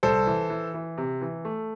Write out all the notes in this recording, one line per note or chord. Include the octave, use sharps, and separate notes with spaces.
C2 A4 C5
E3
E3
E3
C3
E3
A3